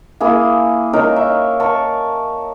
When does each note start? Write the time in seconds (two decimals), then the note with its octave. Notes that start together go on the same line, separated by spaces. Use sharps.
0.20 A#3 E4 G#4
0.93 D#4 A#4 C#5
1.16 E5
1.60 A#4 A5 C#6